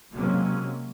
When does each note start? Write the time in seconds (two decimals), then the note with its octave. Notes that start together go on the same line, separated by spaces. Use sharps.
0.12 C3 F#3 G#3 A#3 C4 C#4